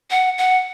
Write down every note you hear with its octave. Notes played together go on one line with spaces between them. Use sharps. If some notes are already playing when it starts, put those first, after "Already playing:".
F#5
F#5